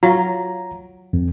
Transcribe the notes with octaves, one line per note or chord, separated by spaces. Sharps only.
F#3 F4 A#5
F2